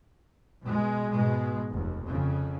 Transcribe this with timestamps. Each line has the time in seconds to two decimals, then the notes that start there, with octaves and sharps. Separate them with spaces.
0.65 B2 G#3
1.12 G#2 B2 G#3
1.71 F1 D#2
2.07 F2 C#3